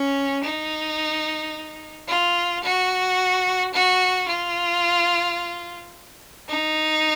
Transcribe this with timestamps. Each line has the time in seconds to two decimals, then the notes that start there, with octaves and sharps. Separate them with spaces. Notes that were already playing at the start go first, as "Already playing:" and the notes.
Already playing: C#4
0.44 D#4
2.08 F4
2.64 F#4
3.74 F#4
4.28 F4
6.48 D#4